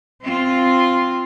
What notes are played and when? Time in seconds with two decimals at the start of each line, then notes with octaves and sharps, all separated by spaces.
0.21 C4 F4